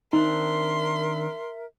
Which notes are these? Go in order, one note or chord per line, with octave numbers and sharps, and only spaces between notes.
D#3 C4 D4 D#4 A#4 E5 C6